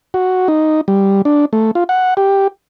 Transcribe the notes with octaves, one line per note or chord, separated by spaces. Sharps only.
F#4
D#4
G3
D4
A3
F4
F#5
G4